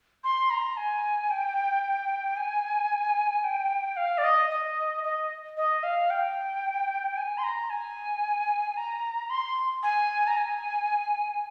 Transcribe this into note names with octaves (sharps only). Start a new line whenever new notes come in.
C6
A#5
G#5
G5
G#5
G5
F5
D5
D#5
D#5
D#5
D#5
F5
G5
G#5
C6
A#5
G#5
A#5
C6
G#5
A#5
G#5